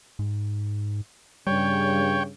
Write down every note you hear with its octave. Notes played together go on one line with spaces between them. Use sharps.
G#2
G2 C#3 G3 C#5 G5